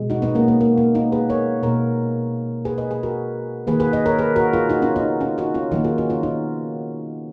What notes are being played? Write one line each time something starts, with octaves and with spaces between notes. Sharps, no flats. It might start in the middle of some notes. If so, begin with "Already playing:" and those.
Already playing: B2 G#3
D#4 F#4
B3 D#4
A#3 C#4
A#3
A#3
A#3
B3 D#4
G#4 B4
A#4 C#5
B2 A#3 A#4 C#5
G#4 B4
B4 D#5
G#4 B4
F#4 A#4
D#3 A#3 G#4 B4
G#4 B4
B4 D#5
A#4 C#5
G#4 B4
F#4 A#4
F4 G#4
D#4 F#4
C#4 F4
B3 D#4
C#4 F4
D#4 F#4
C#4 F4
D#3 F#3 A#3 D#4 F#4
F4 G#4
D#4 F#4
C#4 F4
B3 D#4